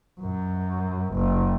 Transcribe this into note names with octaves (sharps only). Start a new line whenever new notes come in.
F#2
F#1